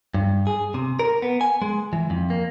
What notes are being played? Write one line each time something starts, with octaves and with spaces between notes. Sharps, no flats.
G2
G#4
C3
A#4
B3
G#5
G#3
E3
F2
A#3